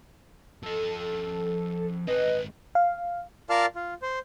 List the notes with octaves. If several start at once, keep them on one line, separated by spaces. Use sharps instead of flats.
F3 A4 D#5
G#3 C4 B4 D#5
F5
F4 A#4 D5 F5 A5 F6
F4
C5